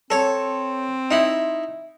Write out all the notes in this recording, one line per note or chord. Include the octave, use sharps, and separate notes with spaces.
C4 A4 C#5
D#4 E4